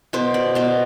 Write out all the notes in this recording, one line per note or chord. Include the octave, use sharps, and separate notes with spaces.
B2 C5
D5
B2 C5